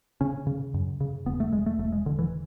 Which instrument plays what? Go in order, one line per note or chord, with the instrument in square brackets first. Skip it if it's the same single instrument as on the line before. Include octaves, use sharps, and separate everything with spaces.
[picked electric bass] C#3 C#4
C#3
F#2
C#3
E1 B3
A3
E1 G#3
A3
E1 A3
G#3
E1 D3
E3